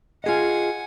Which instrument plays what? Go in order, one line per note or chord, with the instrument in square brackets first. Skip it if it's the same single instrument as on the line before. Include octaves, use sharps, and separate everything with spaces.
[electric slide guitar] F4 G#4 D#5 [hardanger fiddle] F#5 G#5